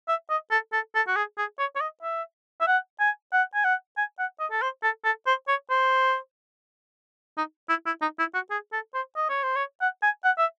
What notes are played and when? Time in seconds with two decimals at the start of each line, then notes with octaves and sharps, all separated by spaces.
0.08 E5
0.30 D#5
0.51 A4
0.73 A4
0.95 A4
1.08 F#4
1.16 G#4
1.38 G#4
1.59 C#5
1.76 C#5
1.81 D#5
2.03 E5
2.61 E5
2.67 F#5
3.00 G#5
3.32 F#5
3.55 G#5
3.64 F#5
3.97 G#5
4.19 F#5
4.40 D#5
4.51 A4
4.62 C5
4.83 A4
5.05 A4
5.27 C5
5.48 C#5
5.70 C5
7.38 D#4
7.69 E4
7.86 E4
8.02 D#4
8.19 E4
8.34 F#4
8.51 G#4
8.73 A4
8.94 C5
9.16 D#5
9.29 C#5
9.43 C5
9.56 C#5
9.81 F#5
10.03 G#5
10.24 F#5
10.38 E5